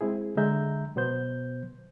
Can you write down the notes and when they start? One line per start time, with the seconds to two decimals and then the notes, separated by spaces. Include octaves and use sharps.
0.01 G#3 C4 E4 G#4
0.37 D3 G#3 E5 A#5 G6
0.96 B2 F#3 B3 C5 G6